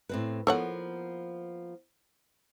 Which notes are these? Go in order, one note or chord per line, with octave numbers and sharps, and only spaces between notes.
A2 C4 B4
F3 A#3 B3 A4 C#5 F#5